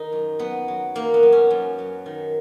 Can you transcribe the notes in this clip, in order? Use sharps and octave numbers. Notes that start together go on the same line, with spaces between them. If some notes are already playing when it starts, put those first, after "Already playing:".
Already playing: D#3 D#4
F#2
F#2 B3
F#3
D#3 A#3
B3
F#2
C#4
F#2
F#3
D#3